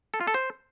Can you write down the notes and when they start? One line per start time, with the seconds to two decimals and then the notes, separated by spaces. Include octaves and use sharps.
0.14 A4
0.21 F4
0.27 A4
0.34 C5